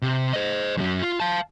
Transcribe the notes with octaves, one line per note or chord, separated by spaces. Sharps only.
C3
C5 D#5
F#2 F#3
F4
F5 A5